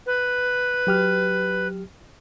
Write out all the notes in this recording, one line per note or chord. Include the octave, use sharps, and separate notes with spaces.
B4
F#3 G4 F6